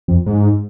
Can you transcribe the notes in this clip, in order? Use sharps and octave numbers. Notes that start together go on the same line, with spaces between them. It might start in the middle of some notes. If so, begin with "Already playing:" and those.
F2
G#2